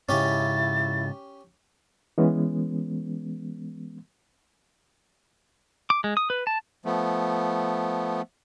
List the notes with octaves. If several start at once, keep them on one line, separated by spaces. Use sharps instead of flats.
G#2 C#3 C#4 E4 G4 A6
E3 G#3 B3 C#4
D6
G#3
D#6
B4
A5
F3 A3 B3